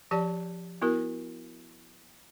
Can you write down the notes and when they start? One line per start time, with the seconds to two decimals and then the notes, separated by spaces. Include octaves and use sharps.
0.11 F3 G4 D5 A5
0.82 B3 E4 F#4 A#4